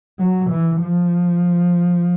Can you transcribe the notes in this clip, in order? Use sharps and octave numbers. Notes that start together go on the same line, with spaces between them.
F#3
E3
F3